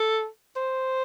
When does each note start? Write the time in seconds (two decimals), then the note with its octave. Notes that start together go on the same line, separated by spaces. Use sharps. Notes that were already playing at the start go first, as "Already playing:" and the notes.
Already playing: A4
0.56 C5